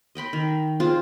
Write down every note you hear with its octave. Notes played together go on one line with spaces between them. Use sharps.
D#5 G5 B5 C6
D#3
C4 F4 G#4 C5